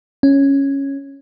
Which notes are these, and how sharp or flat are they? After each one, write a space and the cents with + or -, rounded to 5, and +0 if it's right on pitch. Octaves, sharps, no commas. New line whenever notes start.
C#4 -5